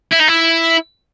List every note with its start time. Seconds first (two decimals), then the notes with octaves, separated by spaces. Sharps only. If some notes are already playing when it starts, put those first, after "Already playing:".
0.13 E4
0.20 D#4
0.29 E4